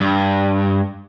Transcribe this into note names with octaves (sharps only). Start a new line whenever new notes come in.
G2